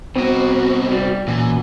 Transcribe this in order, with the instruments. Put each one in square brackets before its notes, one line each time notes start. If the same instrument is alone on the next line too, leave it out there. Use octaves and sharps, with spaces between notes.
[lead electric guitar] C2 F#4 [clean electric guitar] B2 [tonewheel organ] C4
[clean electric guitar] G3
[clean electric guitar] F#2 [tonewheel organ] A#2 [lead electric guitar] E3